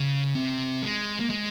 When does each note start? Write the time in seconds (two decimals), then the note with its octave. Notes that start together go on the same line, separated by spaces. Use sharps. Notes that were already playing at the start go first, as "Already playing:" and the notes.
Already playing: C#3
0.35 C3
0.83 G#3
1.20 A#3
1.30 G#3